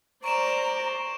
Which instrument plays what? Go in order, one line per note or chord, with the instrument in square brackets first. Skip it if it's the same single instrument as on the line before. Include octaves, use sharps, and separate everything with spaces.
[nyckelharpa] C5 [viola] D5 [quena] A#5 [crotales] C#6 D7 E7